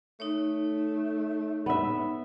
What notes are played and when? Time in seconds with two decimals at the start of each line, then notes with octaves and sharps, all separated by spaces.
0.20 A3 D#4 C#5
1.66 B3 E5